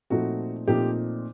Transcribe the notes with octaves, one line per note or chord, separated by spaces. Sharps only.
A#2 F3 A3 C4 D#4 F#4
A#2 F3 A3 C4 D#4 G4